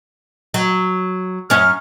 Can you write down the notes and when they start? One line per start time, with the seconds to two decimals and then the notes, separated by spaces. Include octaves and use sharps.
0.54 F#3
1.50 F#2 C#4 F6